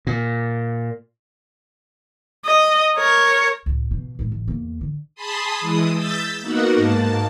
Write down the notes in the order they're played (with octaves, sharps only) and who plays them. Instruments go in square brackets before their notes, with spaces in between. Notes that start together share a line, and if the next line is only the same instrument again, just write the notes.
[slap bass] A#2
[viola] D#5
A#4 C#5
[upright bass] C#2 A2
B2 F3
A#2 G#3
A1
E2 A#3
D3
[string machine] G#4 A5 B5 C6 D#6
E3 G#3 E4 D#6
E6 G6 A6 B6
A#3 B3 D#4 F#4 A#4 F#5
G#2 A#3 A5